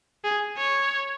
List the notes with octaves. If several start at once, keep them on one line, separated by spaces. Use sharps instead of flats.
G#4
C#5